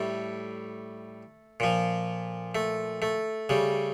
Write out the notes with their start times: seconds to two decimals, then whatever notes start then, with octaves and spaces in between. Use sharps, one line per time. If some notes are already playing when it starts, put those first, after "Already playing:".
Already playing: A2 G3 A3
1.60 A#2 F3
2.55 A3
3.02 A3
3.49 C#3 G3